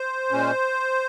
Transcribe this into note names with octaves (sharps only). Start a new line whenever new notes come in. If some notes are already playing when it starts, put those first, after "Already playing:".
Already playing: C5
A#2 G#3 C#4